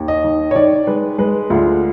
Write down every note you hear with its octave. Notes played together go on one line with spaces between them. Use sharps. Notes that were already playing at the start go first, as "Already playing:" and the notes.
Already playing: D#2
D#5
D#3
C#5
D#3 D5
G#3 B4
G#3 B4
D2 F4